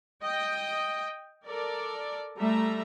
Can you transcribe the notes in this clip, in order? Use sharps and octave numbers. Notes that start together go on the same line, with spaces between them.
D#5 G5
A4 A#4 D5
G3 A3 E5 A#5